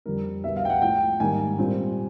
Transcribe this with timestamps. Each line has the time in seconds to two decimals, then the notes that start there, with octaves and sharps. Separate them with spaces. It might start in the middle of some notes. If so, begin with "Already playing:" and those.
0.06 F2 D3 G3 C4 A#4
0.44 B2 G3 B3 E5
0.57 F5
0.65 G5
0.70 F#5
0.82 A2 F3 G#3 G5
1.20 G#2 D#3 G3 A#3 G#5
1.58 A#2 G3 C4